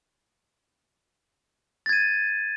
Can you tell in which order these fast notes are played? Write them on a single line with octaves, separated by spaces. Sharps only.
A6 G#6 D#7